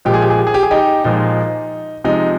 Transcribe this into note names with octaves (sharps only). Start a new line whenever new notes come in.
A#2 F3 G#3 G4
G#4
G4
G#4
G4
G#4
G4
G#4
D#4 G4
A#2 F3 G#3 D#4
C3 F3 G#3 D#4